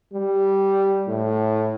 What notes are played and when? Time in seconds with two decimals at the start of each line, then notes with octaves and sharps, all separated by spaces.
0.13 G3
1.08 A2